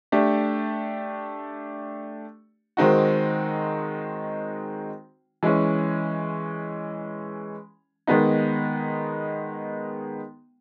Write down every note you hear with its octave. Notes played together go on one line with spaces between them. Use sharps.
A3 D4 G4
D#3 G#3 C4 D#4 F#4
E3 G#3 C#4
D#3 G#3 B3 D#4